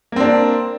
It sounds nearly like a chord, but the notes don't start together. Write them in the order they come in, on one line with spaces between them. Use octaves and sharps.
A#3 C4 D4